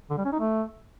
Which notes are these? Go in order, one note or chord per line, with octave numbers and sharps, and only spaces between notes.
D3
G3
C#4
D#4
A3